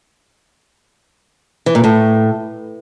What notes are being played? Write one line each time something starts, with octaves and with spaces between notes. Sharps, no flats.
E3
A#2
A2